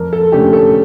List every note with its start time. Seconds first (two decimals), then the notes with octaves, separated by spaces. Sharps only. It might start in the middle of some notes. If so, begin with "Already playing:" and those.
Already playing: F2 A#4
0.13 A4
0.32 D3 A3 C#4 G4
0.53 A4